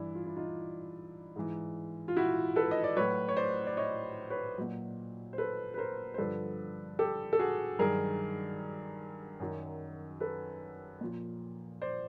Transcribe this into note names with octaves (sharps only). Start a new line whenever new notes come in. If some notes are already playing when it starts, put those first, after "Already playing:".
Already playing: G2 E3 D4 E4
F4
E4
D#4 F4
G#2 E3
F4
E4 F#4
A4 B4
D#5
D5
A2 F#3 B4 C#5
C#5
C5 D5
D5
C#5 D#5
B4 C#5
A#2 F#3
C5
A4 B4
B4
A#4 C5
C5
G2 D3 F3 A4 B4
G4 A4
A4
F#4 G#4
G2 D#3 F#3 G#4 A#4
F#2 D#3 F#3
A4 B4
A#2 F3
C5 D5